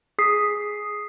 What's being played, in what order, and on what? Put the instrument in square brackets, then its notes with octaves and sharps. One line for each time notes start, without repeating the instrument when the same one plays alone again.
[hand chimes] G#4 D#6 B6 C7